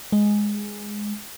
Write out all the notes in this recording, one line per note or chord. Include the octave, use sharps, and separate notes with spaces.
G#3